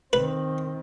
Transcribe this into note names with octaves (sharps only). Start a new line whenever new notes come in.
D#3 C4 B4